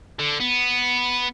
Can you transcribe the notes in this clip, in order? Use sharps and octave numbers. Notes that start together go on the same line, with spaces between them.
D3
B3